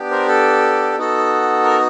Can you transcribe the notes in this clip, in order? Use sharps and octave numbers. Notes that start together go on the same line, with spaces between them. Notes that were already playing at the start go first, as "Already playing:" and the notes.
Already playing: B3 D4 G4
A#4 C5
A4
B3 D#4 F#4 A4
A#4